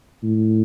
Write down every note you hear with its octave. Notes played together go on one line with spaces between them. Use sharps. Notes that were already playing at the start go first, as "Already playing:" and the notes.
A2